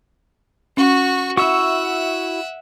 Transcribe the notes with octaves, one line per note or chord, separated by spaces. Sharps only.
C#4 F#4 C#6
E4 F#4 E5 F#5 C#6 E6